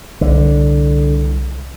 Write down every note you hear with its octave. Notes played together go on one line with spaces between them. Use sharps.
C2 D3